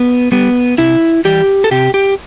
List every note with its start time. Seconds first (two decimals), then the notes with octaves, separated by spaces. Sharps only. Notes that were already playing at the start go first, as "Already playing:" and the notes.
Already playing: B3
0.32 G3 B3
0.78 C3 E4
1.25 E3 G3 G4
1.64 A4
1.71 C3 G4
1.94 G4